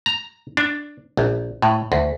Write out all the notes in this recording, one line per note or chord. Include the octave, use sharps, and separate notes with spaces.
A#5
D4
A#1
A2
D2